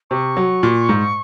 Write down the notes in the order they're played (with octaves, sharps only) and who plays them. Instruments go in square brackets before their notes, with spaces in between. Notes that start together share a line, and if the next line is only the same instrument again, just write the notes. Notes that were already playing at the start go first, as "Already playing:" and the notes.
[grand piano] C3 [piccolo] C#6
[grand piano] F#3
A#2
G#2